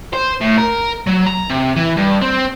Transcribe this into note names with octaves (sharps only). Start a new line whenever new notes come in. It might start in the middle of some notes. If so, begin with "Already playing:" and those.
C5
A2
A#4
F#3
A#5
C3
E3
G2
C4